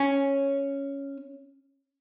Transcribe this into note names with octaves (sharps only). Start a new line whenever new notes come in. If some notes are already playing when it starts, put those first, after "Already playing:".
Already playing: C#4